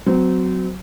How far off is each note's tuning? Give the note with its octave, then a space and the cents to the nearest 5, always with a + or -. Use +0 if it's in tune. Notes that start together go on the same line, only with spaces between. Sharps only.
F#3 +0 C4 -30